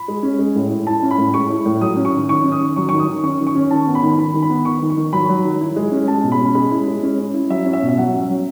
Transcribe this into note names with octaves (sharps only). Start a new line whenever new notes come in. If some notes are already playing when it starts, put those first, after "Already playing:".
Already playing: B5
G#3
C#4
G#3
A2
E4
E4 A5
C#4
B5
A2
G#3 C#6
E4
A2
F#3 D#6
C#4
C#6
D#3
D#3 C#6
C#4
D#6
D#3
F#3 C#6
D#3 C#6
D#6
D#3
C#4 C#6
D#3
C#6
C#4
D#3 A5
B3
B5
D#3
D#3 B5
D#3
B5
B3
D#3 C#6
D#3
C#6
D#3
F#3 B5
F#3
D#3
E4
G#3
C#4
G#3 A5
B2
B5
C#4
G#3 B5
E4
G#3
C#4
C#4
E4
F#3 E5
C#4
E5
B2
E5
F#3 F#5
C#4
F#3